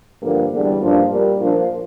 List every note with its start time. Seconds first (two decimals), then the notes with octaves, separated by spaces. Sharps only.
0.21 G2 D3 F3 A#3
0.51 E2 D3 G3
0.80 G2 F3 A#3 D4 F4
1.10 A#2 G3 A#3
1.40 A#2 F3 A#3 D4 F4